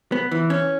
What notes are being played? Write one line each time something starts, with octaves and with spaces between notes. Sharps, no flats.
B3
E3
C#4